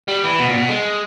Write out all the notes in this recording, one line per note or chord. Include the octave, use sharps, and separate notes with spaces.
G3
E3
B2
A#2
B2
G#3